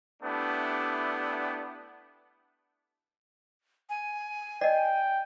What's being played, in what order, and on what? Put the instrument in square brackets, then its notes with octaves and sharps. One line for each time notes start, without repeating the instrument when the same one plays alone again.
[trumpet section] A3 B3 D4 E4 G4
[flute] G#5
[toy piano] D5 D#5 [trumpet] G5